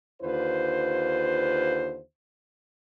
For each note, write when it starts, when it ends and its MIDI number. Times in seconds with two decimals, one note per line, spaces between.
0.22 2.00 39
0.22 2.00 50
0.22 2.00 65
0.22 2.00 71
0.22 2.00 72